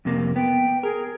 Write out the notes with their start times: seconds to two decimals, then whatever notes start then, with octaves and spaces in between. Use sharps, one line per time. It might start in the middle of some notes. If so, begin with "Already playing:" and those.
0.05 F2 C3 A#3
0.36 B3 G5
0.83 G#4 A#4